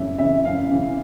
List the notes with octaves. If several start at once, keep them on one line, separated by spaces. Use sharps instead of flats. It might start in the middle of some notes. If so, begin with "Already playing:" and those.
Already playing: F#2 C#3 E3 E5
C#3 E3 E5
F#2 F5
C#3 E3